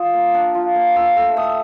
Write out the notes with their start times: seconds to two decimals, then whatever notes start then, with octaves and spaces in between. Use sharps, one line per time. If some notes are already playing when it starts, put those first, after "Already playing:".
Already playing: F4 D#6
0.13 A#3
0.34 D4
0.55 F4
0.75 A#3
0.96 F4 E6
1.17 A3 E6
1.37 A3 D#6